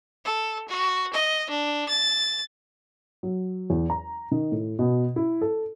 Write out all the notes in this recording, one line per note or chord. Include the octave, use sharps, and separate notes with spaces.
A4
F#4
D#5
D4
A6
F#3
E2
A#5
D#3
A2
B2
E4
A4